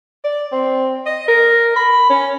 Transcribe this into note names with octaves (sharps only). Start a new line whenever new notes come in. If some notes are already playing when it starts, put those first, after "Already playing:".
D5
C4
D#5
A#4
B5
C#4